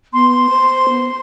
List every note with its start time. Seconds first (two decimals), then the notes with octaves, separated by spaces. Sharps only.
0.13 B3 C6
0.50 C5
0.89 B3